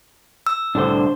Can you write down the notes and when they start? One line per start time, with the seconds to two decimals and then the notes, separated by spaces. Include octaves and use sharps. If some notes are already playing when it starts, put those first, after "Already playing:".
0.47 E6
0.75 C2 A2 D3 D4 C5